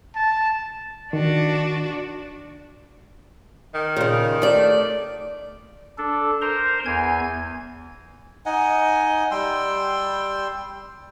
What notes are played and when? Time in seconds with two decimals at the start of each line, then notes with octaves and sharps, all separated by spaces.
0.15 A5
1.13 D#3 D4 F#4
3.74 D#3
3.96 A#2 C#3
4.42 A3 D5
5.98 D4 A4
6.42 A#4 C5 A#5 C6
6.86 E2 G#5 G#6
8.46 D#4 D#5 F#5 G#5
9.31 G3 G5 C6 E6